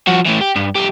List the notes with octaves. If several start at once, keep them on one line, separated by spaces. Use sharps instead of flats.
F3 F#4
A2 E3
G4
G2
B1 G4